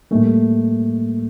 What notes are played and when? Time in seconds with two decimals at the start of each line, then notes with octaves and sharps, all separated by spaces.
0.11 A2 G3 A3 A#3